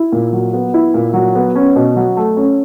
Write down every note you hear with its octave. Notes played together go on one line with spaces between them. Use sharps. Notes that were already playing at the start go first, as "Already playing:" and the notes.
Already playing: E4
A#2
F#3
B3
E4
A#2
F#3
B3
C#4
B2
F#3
A3
C#4